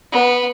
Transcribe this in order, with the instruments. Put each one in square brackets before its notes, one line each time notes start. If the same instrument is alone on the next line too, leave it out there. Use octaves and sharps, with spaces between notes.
[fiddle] B3